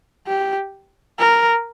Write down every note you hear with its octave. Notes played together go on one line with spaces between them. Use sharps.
G4
A#4